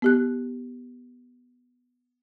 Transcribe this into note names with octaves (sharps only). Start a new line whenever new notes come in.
B3 G4 F#6